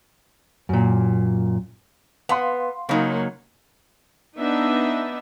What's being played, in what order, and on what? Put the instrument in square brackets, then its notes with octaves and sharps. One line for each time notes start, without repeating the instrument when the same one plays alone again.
[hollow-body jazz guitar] F#2 A#2
[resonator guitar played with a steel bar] B3 [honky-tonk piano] F5 C6
[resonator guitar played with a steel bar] C#3 D#4 [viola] F#3 A#3
[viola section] B3 D4 D#4 E5